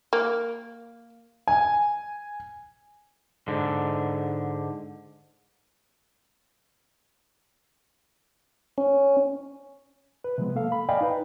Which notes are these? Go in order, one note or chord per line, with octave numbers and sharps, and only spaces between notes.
A#3
G#5
G#2 D3
C#4
B4
C3 F3 G#3 B3
A#3 A4 F5
B5
D5 D#5 F5 G5 G#5 B5
D#4 B4